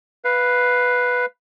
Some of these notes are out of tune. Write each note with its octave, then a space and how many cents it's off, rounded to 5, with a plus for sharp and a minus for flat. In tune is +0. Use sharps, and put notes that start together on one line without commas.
B4 +0 F5 +0